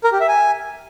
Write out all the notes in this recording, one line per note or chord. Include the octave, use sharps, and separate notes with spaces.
A#4
G4
E5
G#5